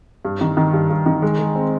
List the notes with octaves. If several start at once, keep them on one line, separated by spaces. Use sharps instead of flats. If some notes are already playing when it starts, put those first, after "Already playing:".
G2
D#3
D#3
G2
G2
D#3
G#3
G#3
C4